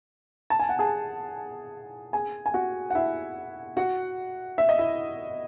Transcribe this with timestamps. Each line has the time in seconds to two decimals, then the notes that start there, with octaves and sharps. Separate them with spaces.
0.50 A5
0.59 G#5
0.69 F#5
0.79 G#4 G#5
2.13 G#4 G#5
2.46 G#5
2.54 F#4 F#5
2.90 F#5
2.95 E4 E5
3.77 F#4 F#5
4.58 E5
4.69 D#5
4.78 E4 E5